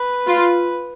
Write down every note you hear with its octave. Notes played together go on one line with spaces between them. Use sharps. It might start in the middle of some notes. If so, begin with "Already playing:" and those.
Already playing: B4
F4